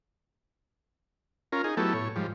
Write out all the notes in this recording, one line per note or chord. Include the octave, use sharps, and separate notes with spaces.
C#4 F4 A#4
D#4 G#4
F#3 A3 B3 E4 G4 A4
A2 C#5
G#2 F3 G3